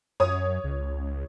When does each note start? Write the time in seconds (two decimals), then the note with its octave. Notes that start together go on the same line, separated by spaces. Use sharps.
0.20 F#2 C#5 D#6
0.64 C#2